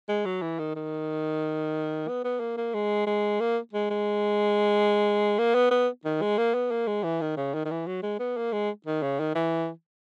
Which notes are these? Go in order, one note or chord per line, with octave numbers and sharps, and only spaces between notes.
G#3
F#3
E3
D#3
D#3
B3
B3
A#3
A#3
G#3
G#3
A#3
G#3
G#3
A#3
B3
B3
D#3
G#3
A#3
B3
A#3
G#3
E3
D#3
C#3
D#3
D#3
E3
F#3
G#3
B3
A#3
G#3
D#3
C#3
D#3
E3